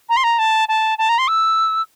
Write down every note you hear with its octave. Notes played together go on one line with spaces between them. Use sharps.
A#5
C6
A#5
A5
A5
A5
A#5
C6
E6